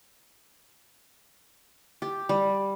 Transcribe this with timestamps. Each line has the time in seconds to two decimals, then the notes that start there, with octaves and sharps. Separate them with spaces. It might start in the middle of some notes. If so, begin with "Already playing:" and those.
2.02 G4
2.29 G3